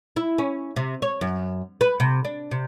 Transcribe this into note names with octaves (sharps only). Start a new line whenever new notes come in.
E4
C#4
C3
C#5
F#2
B4
C3
D4
C3